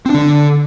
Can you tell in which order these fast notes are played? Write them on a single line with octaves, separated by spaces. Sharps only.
C4 D4 D3